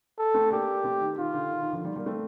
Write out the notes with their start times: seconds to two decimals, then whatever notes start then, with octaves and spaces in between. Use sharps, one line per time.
0.18 A4
0.34 A3 C4
0.51 A#3 D4 G4
0.84 A3 C4
1.01 D#3
1.18 D#3 F4
1.34 D3
1.51 D#3
1.62 D#3
1.73 D3 F3
1.85 D#3 G3
1.96 G3 A#3
2.06 A3 C4